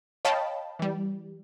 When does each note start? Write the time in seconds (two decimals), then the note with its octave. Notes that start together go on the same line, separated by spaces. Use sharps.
0.25 C#5 D#5 F5 G5 A5 B5
0.79 E3 G3